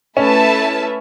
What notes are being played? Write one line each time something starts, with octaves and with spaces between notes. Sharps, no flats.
A3 C#4 E4 B4 E5 A5